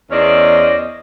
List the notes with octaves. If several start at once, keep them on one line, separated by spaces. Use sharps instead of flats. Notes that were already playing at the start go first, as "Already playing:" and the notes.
E2 C#4 C5 D5 D#5